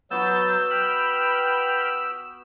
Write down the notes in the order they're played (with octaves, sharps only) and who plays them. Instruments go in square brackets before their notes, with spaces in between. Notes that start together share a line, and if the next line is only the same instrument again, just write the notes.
[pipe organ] F#3 G6 A6 [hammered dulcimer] B3 F#4 B4 [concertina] E6
[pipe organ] G5 B5 F6